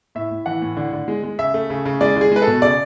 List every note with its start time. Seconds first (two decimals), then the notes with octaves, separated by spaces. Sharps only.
0.15 A2 E5
0.31 A2
0.46 E3 F#5
0.62 A2
0.76 D3
0.93 D3
1.08 G#3
1.23 G#3
1.39 C#3 E5
1.54 A3
1.70 C#3
1.85 C#3
2.01 G#3 D5
2.17 G#3 G#4
2.32 G#3 B4
2.42 A4
2.47 B2
2.62 C#3 D5